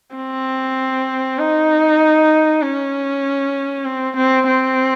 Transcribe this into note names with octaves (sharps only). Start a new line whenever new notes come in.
C4
D#4
C#4
C4
C4
C4